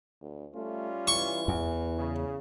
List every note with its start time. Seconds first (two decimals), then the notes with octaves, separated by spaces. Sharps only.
0.22 D2
0.54 G3 A3 C#4 F4
1.08 E3 C#6
1.48 E2
1.98 C#3